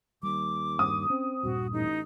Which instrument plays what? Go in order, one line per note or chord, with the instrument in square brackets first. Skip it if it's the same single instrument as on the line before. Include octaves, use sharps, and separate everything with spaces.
[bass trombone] D#2 [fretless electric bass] G3 [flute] D6
[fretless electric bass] G2 [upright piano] D#6
[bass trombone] C4 [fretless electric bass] C#4
[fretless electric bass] D#1 G2 A#2 [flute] F#4
[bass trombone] A1 [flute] D#4